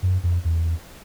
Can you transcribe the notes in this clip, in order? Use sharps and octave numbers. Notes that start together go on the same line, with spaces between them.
F#2
F2
E2